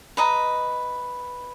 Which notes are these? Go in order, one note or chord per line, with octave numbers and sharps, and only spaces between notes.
B4 D#5 A#5